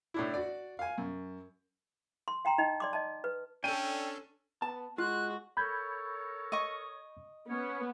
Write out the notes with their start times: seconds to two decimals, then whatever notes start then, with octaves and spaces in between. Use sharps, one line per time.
0.14 A2 D4 E4
0.34 F#4 D5
0.79 F5 G#5
0.98 F#2
2.28 C6
2.45 F#5 G5 A#5 C6
2.58 D#4 D#5 G5
2.80 D5 C6 D6
2.93 D#5 A5
3.24 B4
3.64 C#4 D4 A4 G5 D#7
4.62 B3 A5
4.98 G#3 F4 F#4 F#6
5.57 A4 A#4 C#5 B5 G6 G#6
6.52 D#5 C#6
7.48 B3 C#4 C#5